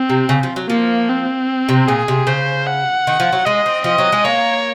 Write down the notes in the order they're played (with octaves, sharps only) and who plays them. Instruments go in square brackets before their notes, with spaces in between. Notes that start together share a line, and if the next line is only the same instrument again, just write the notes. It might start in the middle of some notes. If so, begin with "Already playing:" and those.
Already playing: [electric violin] C4
[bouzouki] C3
C#3
F3
F#3
[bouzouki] F3 [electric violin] A#3
[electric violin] C4
[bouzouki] C3
[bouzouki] A#2 [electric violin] G#4
[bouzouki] C3
[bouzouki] C#3 [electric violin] C5
[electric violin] F#5
[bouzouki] D#3
F3
F#3
[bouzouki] G#3 [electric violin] D#5
[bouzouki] C4
[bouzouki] F3 [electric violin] D#5
[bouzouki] F#3
G#3
[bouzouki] A#3 [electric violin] C#5